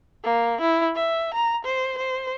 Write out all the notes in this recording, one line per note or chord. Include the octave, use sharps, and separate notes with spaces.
A#3
E4
E5
A#5
C5
C5